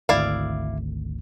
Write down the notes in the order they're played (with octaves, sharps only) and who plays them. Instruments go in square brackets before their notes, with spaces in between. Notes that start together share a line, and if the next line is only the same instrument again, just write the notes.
[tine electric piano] G#1 D2 [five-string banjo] E4 D5 F5